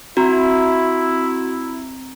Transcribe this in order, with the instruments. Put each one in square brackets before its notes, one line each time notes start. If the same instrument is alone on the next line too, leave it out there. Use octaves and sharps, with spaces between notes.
[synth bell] C4 A#5 [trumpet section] E4 [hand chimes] F#4